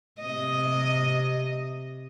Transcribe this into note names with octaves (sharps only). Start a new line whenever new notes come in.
C3 D#5